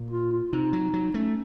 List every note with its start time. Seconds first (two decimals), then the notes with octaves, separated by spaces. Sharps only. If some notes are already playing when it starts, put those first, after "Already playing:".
Already playing: A#2
0.10 F4
0.31 F4
0.52 C3 D#4
0.73 F#3
0.93 F#3
1.14 A3 C#4